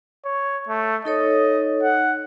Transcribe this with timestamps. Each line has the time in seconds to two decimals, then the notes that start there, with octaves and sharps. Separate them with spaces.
0.25 C#5
0.69 A3
1.05 D#4 A4 C#5 D#5
1.83 F#5